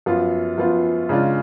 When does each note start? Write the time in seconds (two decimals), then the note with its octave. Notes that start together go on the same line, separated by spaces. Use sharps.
0.06 F#2 F3 B3 F4
0.58 F#2 F3 B3 F4
1.09 C#3 G#3 D4 F4